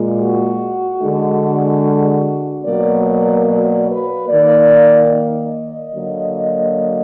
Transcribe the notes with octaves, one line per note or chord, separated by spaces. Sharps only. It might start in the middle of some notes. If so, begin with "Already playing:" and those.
Already playing: A#2 G#3
F#4
D3 G#3
B2 F#3 A#3 D5
D5
D5
B4
D#3 A#3 D5
D#5
D3 F#3 A#3